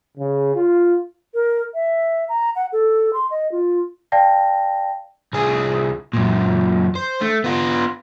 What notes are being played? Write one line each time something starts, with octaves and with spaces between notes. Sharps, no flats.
C#3
F4
A#4
E5
A#5
F#5
A4
C6
D#5
F4
D5 F5 G5 A5 A#6
C2 G#4
F#2 A#2
C5
A3
B3 F4